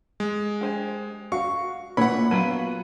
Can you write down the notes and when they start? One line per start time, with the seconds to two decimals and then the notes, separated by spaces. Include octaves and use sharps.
0.20 G#3
0.61 G4 C5 G#5
1.32 F#4 F5 C#6
1.97 A#2 E4 B4 C#5 F#5 B5
2.31 F#3 B3 F4 D#7